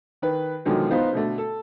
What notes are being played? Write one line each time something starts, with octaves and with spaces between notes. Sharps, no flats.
D#3 B4
B2 D3 D#3 F3 F#3 G#3
B3 D#4 F4 B4 C5
B2 D3 A3
A4